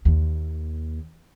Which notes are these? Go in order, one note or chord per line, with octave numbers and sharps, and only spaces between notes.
D#2